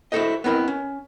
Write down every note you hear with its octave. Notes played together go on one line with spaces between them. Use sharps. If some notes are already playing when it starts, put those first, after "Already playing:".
E4 F#4 G4 A4 C5 D#5
B3 C4 E4 A#4 D#5
C#4